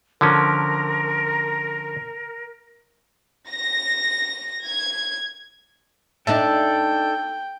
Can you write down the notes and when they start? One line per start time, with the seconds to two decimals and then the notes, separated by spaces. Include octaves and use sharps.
0.21 D3 F3 C#4 A#4
3.50 A#6
4.65 G#6
6.27 D4 D#4 A4 E5 G5